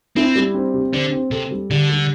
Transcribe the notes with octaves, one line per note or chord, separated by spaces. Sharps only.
C4 E4
G3
C4
C3
D3 C5
C4
C3 A4
G3
D3 G4
G3